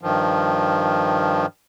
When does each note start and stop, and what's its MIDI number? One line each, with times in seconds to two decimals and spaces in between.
0.01 1.46 43
0.01 1.46 51
0.01 1.46 53